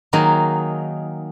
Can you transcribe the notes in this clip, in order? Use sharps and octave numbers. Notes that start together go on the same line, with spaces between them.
D#3 F#3 A#3 D#4 G#4